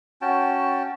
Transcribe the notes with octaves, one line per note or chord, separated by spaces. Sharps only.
C#4 F#4 G5 A5